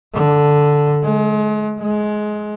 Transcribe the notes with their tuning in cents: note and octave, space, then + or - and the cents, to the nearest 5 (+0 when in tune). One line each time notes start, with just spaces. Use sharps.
D3 +0
G#3 +35
G#3 +20